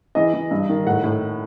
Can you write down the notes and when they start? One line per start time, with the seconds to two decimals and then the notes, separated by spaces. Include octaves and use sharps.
0.15 E3 D#5
0.34 E3
0.51 G2
0.69 D#3
0.86 A2 F#5
1.03 A2